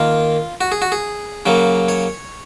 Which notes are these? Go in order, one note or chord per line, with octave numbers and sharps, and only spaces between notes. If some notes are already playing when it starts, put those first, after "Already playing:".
Already playing: D#3 A#3 F4
F#4
G#4
F#4
G#4
C#3 F#3 A#3
C#5